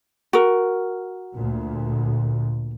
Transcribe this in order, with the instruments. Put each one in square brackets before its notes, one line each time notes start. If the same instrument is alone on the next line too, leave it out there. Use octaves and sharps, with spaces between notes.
[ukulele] F#4 A#4
[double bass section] D2 A#2